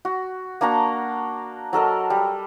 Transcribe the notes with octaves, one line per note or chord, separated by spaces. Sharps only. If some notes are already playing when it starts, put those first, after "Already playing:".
F#4
A#3 D4 F#4 A#5
F#3 A4 A#4 D#5
G3